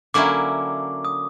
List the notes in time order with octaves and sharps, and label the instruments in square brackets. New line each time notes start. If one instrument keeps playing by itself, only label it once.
[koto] D3 F#3 A#3 C#4 E4 [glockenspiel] D6
[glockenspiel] D#6